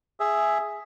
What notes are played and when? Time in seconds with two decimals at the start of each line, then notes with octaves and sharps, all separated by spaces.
0.20 G#4 E5